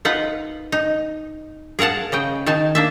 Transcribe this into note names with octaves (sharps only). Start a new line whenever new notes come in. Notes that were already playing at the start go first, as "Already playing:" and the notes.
D#4 F4 B4 F#5
D#4
G#4 A#4 F5 F#5 A5
C#3 D#5 G5
D#3 D#4 G#5 A5
A#3 D4 E5